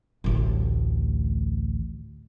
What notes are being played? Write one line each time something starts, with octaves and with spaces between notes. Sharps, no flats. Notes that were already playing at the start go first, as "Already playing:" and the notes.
A1 D2